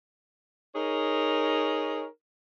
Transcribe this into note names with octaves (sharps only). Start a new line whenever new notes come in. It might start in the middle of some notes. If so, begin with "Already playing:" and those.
D#4 G#4 A#4 C#5